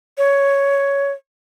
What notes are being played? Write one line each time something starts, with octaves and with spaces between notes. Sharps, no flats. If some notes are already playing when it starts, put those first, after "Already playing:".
C#5